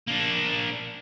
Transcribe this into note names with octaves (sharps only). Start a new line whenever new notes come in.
A#3 D4